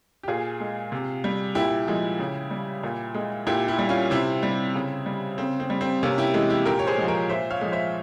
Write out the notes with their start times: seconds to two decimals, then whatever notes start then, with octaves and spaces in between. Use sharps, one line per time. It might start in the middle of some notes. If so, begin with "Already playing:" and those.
0.23 G4
0.28 A#2 F4 G#4
0.60 G#3
0.92 C3
1.24 G3
1.55 A#2 E4 G4
1.87 F3 G#3
2.19 C#3
2.51 G3
2.83 A#2
3.15 G#3
3.47 A#2 E4 G4
3.68 E4 G4
3.79 G3
3.89 C#4 F4
4.11 C3 C4 E4
4.43 G3
4.75 C#3
5.06 G3
5.38 C#3 C4
5.60 C4
5.70 G3
5.81 C4
6.03 C3 A#3 C#4
6.18 E4 G4
6.34 E3 G#3
6.50 E4 G4
6.65 A#2 G4 A#4
6.79 C#5
6.87 G#4 C5
6.98 F3 G#3
7.08 A#4 C#5
7.29 A#2 C5 E5
7.50 C#5 F5
7.61 F3 G#3
7.72 C5 E5